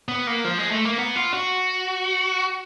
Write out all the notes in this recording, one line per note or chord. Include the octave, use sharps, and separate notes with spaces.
B3
A#3
F3
G#3
A3
A#3
B3
F4
F#4